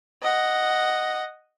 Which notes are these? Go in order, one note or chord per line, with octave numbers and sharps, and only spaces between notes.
D#5 F#5